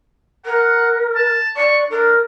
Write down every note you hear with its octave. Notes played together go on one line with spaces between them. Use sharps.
A#4 F#5
A5
D5 C#6
D4 A#4